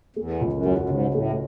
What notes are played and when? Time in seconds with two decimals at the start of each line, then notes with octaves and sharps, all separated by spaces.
0.16 E2 A3
0.41 C#2
0.53 F#2
0.65 E2 F#3
0.78 F#2
0.90 G#2 C#3
1.14 A2 A3